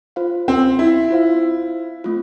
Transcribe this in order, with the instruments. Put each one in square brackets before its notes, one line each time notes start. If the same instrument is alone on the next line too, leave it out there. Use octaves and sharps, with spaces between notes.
[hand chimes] F4 C5 F5
[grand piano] C4
E4
[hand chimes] F4 C5 F5
A3 C4 F4